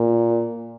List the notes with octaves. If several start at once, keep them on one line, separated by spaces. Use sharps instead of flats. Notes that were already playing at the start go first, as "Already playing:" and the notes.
Already playing: A#2